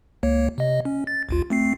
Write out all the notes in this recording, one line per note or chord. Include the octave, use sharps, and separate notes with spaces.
C#2 A#3 C#5
C3 D#5
C#4
A6
A1 D#2 F4
A3 C4 C7